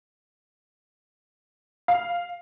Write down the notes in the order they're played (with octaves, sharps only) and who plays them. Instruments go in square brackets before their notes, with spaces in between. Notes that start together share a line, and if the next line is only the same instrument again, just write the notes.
[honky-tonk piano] F5